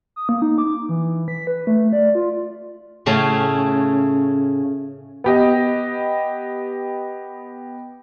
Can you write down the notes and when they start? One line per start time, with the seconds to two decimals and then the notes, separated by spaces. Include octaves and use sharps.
0.16 D#6
0.29 A#3
0.42 D#4
0.58 D6
0.89 E3
1.28 B6
1.47 B4
1.67 A3
1.93 D5
2.15 F4
3.06 A2 C#3 A3 C#4 F5
5.24 B3 G4 D#5